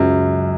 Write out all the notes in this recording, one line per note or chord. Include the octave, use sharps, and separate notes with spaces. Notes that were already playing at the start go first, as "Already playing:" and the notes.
Already playing: C#2 F#2 C#3 F#3